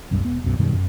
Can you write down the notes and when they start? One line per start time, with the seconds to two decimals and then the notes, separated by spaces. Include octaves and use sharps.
0.11 B1 F#2 G3
0.25 E1 B3
0.44 B1 F#2 B2
0.59 F#2 B2 D#3 G3
0.73 F#2